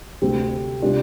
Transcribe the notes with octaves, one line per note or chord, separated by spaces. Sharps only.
D2 C3 G3 C4
C3 G3 D4 F4